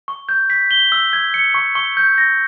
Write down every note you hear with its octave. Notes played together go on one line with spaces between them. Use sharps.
C#6
G6
B6
G7
E6
G#6
C#7
C#6
C#6
G6
A#6